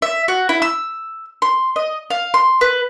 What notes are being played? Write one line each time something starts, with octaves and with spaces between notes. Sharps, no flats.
E5
F#4
E4
E6
C6
D#5
F5
C6
B4